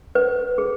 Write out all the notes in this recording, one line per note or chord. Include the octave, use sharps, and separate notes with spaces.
B4
G#4